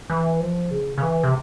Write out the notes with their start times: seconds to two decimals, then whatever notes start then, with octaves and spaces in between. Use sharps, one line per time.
0.10 E3
0.40 F3
0.71 C#3
0.98 C#3
1.02 E3
1.23 C3